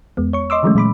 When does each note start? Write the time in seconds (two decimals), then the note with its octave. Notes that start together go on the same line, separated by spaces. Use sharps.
0.17 E2 G#3 B3
0.33 C#5 C#6
0.50 D#5 C6 D6 E6
0.63 D3 E3 F#3 G#3 A3 C#4
0.75 A#2 G#3 B5 D6